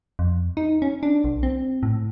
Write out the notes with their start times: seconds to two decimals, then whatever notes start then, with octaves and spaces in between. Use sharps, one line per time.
0.19 F2
0.57 D#4
0.82 C#4
1.03 D4
1.24 B1
1.43 C4
1.83 A2